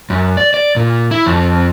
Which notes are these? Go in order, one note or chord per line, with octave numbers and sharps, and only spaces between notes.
F#2
D5
D5
A#2
E4
F2